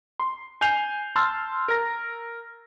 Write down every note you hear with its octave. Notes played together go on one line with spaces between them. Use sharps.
C6
G#5 G6 C7 F7
A5 C6 E6 F6 A6
A#4 A#6